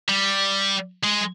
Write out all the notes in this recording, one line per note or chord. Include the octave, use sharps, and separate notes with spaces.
G3
G#3